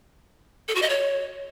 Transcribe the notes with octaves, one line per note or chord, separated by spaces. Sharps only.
A4
F#4
D#5
C#5